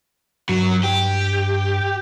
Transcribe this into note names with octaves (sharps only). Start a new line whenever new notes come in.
G2 F#3
G4